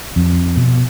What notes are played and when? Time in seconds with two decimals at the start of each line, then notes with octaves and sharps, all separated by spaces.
0.16 F2
0.57 B2